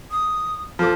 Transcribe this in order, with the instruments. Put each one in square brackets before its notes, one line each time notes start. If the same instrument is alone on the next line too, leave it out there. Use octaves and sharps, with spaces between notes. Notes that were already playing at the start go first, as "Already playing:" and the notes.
[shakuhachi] D#6
[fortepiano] F3 D6 [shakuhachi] A4